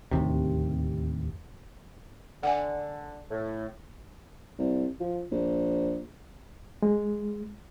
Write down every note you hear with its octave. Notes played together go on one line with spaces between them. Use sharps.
D1 G1 D#2 C3
D3 F#5 G#5
A2
C2
F3
A#1
G#3